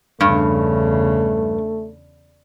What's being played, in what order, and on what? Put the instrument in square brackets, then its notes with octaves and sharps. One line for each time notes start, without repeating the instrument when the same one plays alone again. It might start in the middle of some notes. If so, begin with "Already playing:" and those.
[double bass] E2 C#3 [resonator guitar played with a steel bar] G2 [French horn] A3